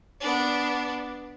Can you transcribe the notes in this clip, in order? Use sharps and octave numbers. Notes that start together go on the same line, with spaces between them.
B3 D4